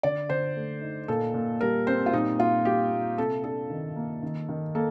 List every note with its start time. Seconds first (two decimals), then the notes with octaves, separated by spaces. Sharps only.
0.03 D3 D5
0.29 D3 C5
0.56 A3
0.81 D#4
1.08 A#2 A4
1.34 A#2
1.61 G3 A#4
1.87 C4 C5
2.06 F4
2.13 A#2 D#4
2.39 A#2 F4
2.65 G3 G4
2.92 A#3
3.18 C3 A4
3.44 D4 A4
3.70 D#3
3.96 A#3
4.23 D#3
4.49 D#3
4.75 A#3 A4